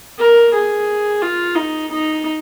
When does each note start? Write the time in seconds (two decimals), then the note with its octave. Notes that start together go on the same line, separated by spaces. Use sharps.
0.19 A#4
0.53 G#4
1.22 F4
1.55 D#4
1.91 D#4